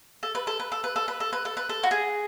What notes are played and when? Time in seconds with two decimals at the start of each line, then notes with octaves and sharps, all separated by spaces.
0.23 A4
0.35 B4
0.47 A4
0.60 B4
0.72 A4
0.84 B4
0.96 A4
1.08 B4
1.20 A4
1.33 B4
1.45 A4
1.57 B4
1.69 A4
1.83 F#4
1.91 G#4